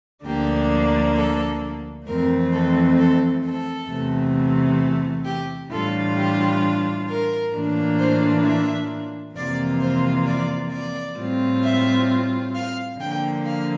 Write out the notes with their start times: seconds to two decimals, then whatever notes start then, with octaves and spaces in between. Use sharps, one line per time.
0.25 D2 D3 F3 A#3 D4 G4
1.16 A4
2.07 F2 E3 A3 C4 A#4
2.53 A4
2.98 A4
3.45 A4
3.89 E2 C3 E3 A3
5.26 G4
5.71 A2 E3 G3 D4 F4 A4
6.17 G4
7.08 A#4
7.54 A2 E3 A#3 D4 F4
7.99 C5
8.45 E5
9.35 F2 C3 E3 A#3 F4 D5
9.81 C5
10.26 D5
10.72 D5
11.18 A2 G3 C4 F4
11.63 E5
12.55 F5
13.00 D3 F3 A#3 G5
13.46 F5